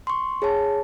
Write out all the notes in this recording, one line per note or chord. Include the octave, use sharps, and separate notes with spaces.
C6 C#6
G#4 C#5 A5